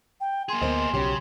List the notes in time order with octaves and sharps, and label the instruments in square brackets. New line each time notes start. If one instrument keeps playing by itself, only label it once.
[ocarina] G5
[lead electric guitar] A#3 G#4 [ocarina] C6
[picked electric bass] D2 B3 [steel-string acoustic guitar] A#4 C5 D#5
[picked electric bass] B1 F#3 [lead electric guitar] C#3 [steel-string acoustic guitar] F3 C#4 G4